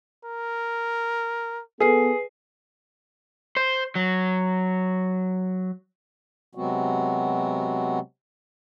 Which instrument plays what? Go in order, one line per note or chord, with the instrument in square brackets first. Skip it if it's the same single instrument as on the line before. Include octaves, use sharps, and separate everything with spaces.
[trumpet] A#4
[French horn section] B3 A4 [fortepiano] G#4 [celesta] B4 C7
[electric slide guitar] C5
F#3
[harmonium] C3 F#3 G#3 B3 C4 F#4